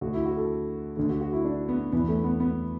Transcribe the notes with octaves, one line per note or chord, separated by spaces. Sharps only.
D2 D3 F#4
E4
F#4
A4
D2 D3
F#4
F#4
E4
D4
B3
E2 E3 B3
A3
B3
B3